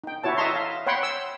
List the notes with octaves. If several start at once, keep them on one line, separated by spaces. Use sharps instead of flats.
D#4 G5
E4 F#4 C#5 A5
D#5 E5 A5 A#5 C6
F5
C#5 F#5 G5 B5 C6
E6